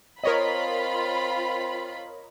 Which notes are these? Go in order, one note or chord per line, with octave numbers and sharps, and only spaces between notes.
C4 F4 A#4 C#5 D#5 B5